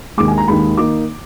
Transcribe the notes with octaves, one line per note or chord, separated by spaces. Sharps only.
D#2 D#3 G#3 D6
G#5
A#5
D#2 D#3 G#3 B5
D#3 A#3 D#4 D6